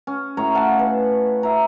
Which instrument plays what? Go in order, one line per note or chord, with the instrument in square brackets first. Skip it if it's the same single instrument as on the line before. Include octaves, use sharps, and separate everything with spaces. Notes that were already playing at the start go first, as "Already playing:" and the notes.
[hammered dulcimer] C#4
A2 C#5 A#5
F5 F#5 A5
B4
E5 A#5